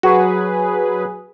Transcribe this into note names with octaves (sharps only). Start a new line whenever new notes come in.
F#3 F#4 G#4 B4